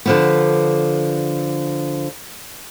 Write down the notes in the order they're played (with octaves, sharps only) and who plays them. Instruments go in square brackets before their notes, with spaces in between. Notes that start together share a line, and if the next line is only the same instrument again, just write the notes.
[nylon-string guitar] D3 F3 B3